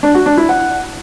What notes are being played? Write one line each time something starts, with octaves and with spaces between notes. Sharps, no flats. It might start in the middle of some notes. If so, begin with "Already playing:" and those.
D4
F#4
D4
E4
F#5